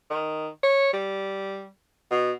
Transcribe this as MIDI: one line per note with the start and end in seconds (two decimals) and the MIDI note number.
0.10 0.48 51
0.63 0.91 73
0.93 1.69 55
2.11 2.32 47